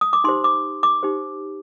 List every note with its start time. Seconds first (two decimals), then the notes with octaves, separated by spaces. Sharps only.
0.01 D#6
0.13 D6
0.24 D#4 G4 C5 C6
0.44 D6
0.83 D6
1.03 D#4 G4 C5